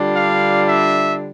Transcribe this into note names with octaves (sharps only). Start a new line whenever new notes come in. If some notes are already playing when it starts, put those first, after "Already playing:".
Already playing: D3 G3 D4 F4
F5
E5